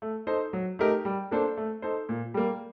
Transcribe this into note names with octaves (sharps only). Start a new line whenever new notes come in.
A3
D#4 A4 C5
F#3
A3 D#4 G4 A#4
G3
A#3 D4 A4 C5
A3
D#4 A4 C5
A#2
G3 A#3